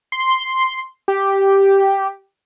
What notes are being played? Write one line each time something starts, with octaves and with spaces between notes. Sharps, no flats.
C6
G4